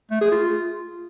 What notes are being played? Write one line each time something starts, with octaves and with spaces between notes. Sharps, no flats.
A3
G#4
F4